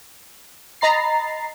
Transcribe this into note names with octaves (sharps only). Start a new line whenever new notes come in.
D#5 A#5 B5 A6 C7